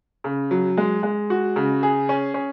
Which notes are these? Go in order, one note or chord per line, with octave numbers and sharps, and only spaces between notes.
C#3
F#3
G#3
G#3
F#4
C#3
G#4
C#4
C#4